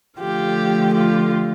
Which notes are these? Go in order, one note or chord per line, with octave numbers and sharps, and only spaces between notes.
D3 F3 A3 F4 G4
F4 G4